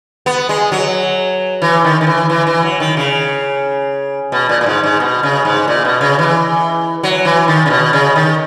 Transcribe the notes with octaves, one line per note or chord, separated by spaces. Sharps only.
B3
G#3
F#3
E3
D#3
D#3
E3
E3
E3
F#3
D#3
C#3
B2
A#2
A#2
G#2
G#2
B2
C#3
G#2
A#2
B2
C#3
E3
F#3
E3
D#3
C#3
B2
C#3
D#3